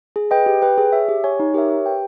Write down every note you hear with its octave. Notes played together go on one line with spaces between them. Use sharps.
G#4
B4 D#5 G5
G4
B4 G5
G#4
C#5 E5
G4
C#5 G#5
D#4
G4 A#4 C#5 E5
G4
B4 G5